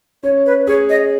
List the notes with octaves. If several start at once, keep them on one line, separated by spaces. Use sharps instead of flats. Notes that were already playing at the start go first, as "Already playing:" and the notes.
C#4 C#5
B4
G#4 C#5
D#5